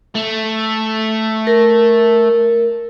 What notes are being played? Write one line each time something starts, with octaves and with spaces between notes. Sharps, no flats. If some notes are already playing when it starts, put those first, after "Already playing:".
A3
A#4